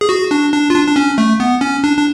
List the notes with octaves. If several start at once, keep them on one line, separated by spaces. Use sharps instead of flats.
G#4
F#4
D4
D4
F4
D4
D4
C#4
A3
B3
C#4
D4
D4